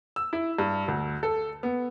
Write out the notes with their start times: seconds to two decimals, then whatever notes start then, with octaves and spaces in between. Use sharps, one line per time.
0.16 E6
0.33 E4
0.59 G2
0.88 D2
1.23 A4
1.63 B3